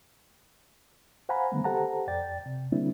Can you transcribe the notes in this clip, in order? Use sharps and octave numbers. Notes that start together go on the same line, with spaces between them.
C5 F5 F#5 G#5 A#5 B5
D3 D#3 G3 A3 B3
G4 A4 C5 F#5 A5 A#5
F2 D5 G5 A6
C3
D3 G3 A#3 C4 D4 E4